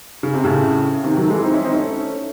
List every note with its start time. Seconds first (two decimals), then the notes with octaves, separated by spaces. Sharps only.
0.23 C#3
0.34 C3
0.44 A2 C#3
1.03 C3 D#3
1.17 D#3 F#3
1.24 A3
1.30 E3 G#3
1.44 C4 D#4
1.54 C#4 E4
1.64 C4 D#4
1.74 A3 C#4